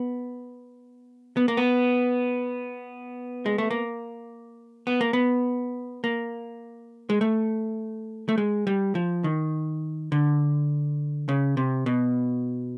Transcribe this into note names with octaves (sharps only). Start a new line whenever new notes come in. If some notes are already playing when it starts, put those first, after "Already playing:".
Already playing: B3
B3
A#3
B3
G#3
A3
A#3
B3
A#3
B3
A#3
G#3
A3
A3
G#3
G3
F3
D#3
D3
C#3
C3
B2